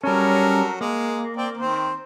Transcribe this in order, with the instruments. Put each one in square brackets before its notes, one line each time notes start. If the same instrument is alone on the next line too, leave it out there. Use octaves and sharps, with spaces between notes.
[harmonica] F#3 A4 A#4 [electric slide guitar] G3 C#4
[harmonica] G#3 [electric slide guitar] A#3
[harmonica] C4 D5 G5
D#3 C4 C5